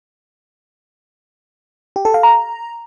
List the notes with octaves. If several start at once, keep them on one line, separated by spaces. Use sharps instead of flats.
G4
A4
F5
A#5